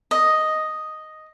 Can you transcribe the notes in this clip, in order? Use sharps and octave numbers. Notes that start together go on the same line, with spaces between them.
D#5